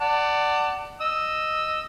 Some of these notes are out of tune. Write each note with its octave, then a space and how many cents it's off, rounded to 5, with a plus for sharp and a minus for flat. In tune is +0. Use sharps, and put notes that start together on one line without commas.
D5 +5 F#5 +20 A5 +30
D#5 +0 E6 +0